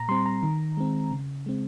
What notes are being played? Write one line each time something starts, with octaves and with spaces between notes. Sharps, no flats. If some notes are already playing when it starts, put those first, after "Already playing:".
Already playing: A#2 A#5
G3 C4 C6
A#5
D#3
G#3 C4
C#3
G#3 C4